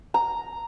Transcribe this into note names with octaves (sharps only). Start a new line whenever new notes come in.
A#5